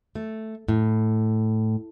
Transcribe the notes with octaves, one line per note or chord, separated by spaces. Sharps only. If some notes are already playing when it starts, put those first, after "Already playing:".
A3
A2